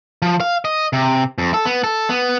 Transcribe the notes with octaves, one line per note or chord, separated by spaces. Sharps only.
F3
F5
D#5
C3
F2
A4
B3
A4
B3